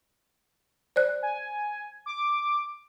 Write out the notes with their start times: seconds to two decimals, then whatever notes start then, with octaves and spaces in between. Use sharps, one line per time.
0.96 C5 D5 F#6
1.23 G#5
2.06 D6